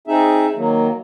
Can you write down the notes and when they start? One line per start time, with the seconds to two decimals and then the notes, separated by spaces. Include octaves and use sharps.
0.07 C4 D#4 G#4 E5
0.56 D#3 F#3 A#3